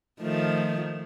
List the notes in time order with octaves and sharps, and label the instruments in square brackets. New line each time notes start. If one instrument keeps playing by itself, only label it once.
[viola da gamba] D#3 F3 A3